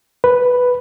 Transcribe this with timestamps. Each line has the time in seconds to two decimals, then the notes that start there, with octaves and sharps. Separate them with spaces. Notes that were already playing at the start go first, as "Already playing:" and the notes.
0.24 B4